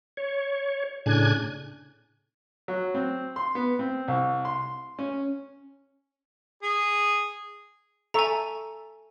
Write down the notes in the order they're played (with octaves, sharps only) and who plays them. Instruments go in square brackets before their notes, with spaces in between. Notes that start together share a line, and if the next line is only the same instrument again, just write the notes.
[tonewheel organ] C#5
A2 C#3 D4 G#5 F#6 G#6
[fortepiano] F#3
C4
C6
B3
C4
C2
C6
C#4
[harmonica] G#4
[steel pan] A4 E5 C#6 [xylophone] G#5 A#5